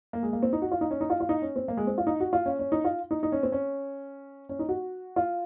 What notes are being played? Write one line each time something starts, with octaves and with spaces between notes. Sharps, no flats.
A#3
G#3
A#3
C4
D#4
F#4
F4
D#4
C#4
D#4
F4
F4
D#4
C#4
C4
A#3
G#3
C4
F4
D#4
F#4
F4
C#4
C#4
D#4
F4
D#4
D#4
C#4
C4
C#4
C#4
D#4
F#4
F4